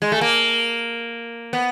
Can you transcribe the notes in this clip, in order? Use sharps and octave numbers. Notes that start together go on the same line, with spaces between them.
G#3
A3
A#3
B3